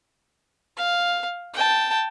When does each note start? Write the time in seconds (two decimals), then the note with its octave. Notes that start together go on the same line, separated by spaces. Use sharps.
0.77 F5
1.54 G5 A5